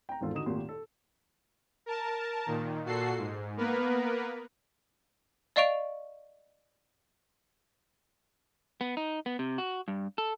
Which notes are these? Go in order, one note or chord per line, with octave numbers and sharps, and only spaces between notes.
G5 A#5
G#1 E2 G#2 F4 A4
D3 D#4 F#4 D#6 E7
G#1 A#2 A3 G4 C6
A4
A#4 A5
A#2 D#3
A#2 F#4 A4 C7
G#2
A#3 B3 A#4 B4
D5 D#5 F5 C#6 D7 F7
B3
D#4
B3
C3
F#4
G2
A4